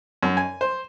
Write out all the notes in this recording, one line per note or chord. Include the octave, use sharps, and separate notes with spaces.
F#2
G#5
C5